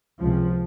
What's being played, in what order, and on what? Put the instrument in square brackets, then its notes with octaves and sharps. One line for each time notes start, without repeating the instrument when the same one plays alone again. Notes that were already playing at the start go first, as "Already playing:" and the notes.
[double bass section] C#2 C3 F3